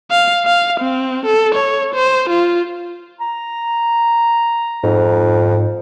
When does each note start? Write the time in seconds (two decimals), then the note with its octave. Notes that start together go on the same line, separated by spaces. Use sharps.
0.11 F5
0.46 F5
0.80 C4
1.26 A4
1.55 C#5
1.94 C5
2.30 F4
3.20 A#5
4.83 F2 G#2